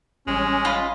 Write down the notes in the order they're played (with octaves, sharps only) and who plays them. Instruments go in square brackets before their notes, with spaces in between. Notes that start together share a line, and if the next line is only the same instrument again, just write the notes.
[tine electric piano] A1 G3 G#5 [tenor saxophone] G#3 [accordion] C#4
[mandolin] F4 D#5 B5